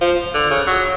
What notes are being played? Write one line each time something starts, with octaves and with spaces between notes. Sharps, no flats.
F3
D3
C#3
F#3